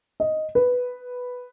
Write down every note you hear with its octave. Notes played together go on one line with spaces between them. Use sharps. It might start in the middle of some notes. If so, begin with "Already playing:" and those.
D#5
B4